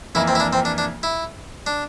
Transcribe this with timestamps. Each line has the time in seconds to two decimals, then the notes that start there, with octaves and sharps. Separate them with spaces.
0.15 F2 E3 A#3 E4
0.28 C4
0.35 E4
0.40 D4
0.53 C4
0.65 D4
0.78 D4
1.03 E4
1.67 D4